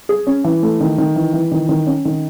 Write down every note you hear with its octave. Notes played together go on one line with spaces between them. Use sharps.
G#4
C#4
E3
A3
D#3
D#3
E3
E3
D#3
D#3
C#4
D#3